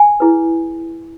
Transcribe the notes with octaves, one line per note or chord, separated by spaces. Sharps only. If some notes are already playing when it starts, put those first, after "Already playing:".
Already playing: G#5
E4 G#4 B4